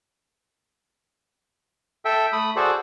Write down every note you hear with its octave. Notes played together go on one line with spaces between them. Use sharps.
A4 E5 G5
A3 B5 D#6
F#4 G#4 A4 C5 D5